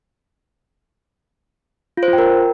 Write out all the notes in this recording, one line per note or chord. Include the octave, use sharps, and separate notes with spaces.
F4
C5
F4
G5
A#4